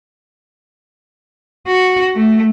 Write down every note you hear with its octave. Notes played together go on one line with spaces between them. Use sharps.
F#4
A3